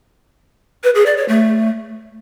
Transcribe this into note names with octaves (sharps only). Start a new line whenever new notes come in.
B4
G#4
D5
C#5
A3